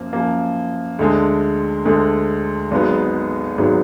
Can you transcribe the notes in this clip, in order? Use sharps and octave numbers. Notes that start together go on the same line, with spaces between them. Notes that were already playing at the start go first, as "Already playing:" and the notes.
Already playing: F#2 F3 A#3
F#2 F3 A#3
D2 D3 G#3
D2 D3 G#3
G#1 G#2 F#3 B3 D#4
G#1 G#2 F#3 B3 D#4